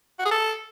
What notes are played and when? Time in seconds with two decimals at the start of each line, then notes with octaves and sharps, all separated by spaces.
0.19 F#4
0.25 G#4
0.31 A4